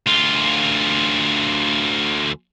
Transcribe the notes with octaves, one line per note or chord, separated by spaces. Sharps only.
D2 F4